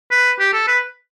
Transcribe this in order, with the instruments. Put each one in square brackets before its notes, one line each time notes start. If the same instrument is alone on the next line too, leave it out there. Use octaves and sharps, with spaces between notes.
[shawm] B4
G4
A4
B4